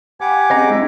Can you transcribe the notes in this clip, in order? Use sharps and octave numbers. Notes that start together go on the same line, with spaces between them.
G4 F5 F#5 G#5 B5 D6
C4 C#4 G#4 C5 D#5 A#5
G#3 C4 D4 E4